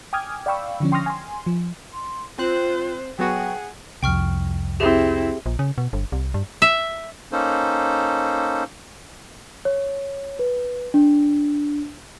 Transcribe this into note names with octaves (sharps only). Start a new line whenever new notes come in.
G5 G#5 D6 D#6 F6 G#6
D5 F5 G5 B5 C#6 E6
D3 F3 C#4
G5 C6 C#6 D#6 F6 A#6
G#5 C6
F3
C6
C4 F4 C5 F#6
F#3 B3 F#4 G#4 F#5 G5
C2 F2 G5 C#6 F6
C4 E4 G4 G#4 E5
A#1
C#3
B2
G1
C2
G2
E5
A#3 C#4 D#4 A4 C5
C#5
B4
D4